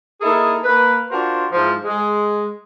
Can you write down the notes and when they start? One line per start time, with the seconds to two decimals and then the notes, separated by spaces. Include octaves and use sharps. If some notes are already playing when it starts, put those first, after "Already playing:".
0.21 A#3 D#4 E4 G#4 A4
0.63 A#3 B4
1.10 D4 F4 F#4 A#4 C5
1.51 G#2 E3 F3
1.85 G#3